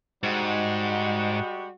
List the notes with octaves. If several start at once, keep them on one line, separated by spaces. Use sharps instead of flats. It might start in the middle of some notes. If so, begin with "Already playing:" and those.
G#2 G3 G#3 F#4